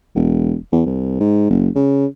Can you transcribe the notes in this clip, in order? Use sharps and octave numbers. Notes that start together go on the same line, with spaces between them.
E1
E2
C2
G#2
F#1
C#3